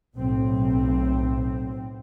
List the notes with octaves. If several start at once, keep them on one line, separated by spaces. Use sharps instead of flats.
B1 A2 C4